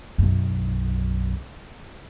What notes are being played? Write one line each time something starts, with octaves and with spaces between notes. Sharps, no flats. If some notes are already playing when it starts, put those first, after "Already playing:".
B1 F#2